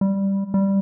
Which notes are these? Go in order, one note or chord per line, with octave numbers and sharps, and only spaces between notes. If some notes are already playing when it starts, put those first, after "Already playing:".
G3
G3